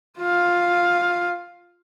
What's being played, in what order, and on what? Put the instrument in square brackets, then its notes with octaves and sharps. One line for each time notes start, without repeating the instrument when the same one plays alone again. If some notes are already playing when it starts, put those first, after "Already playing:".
[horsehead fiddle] F4 F5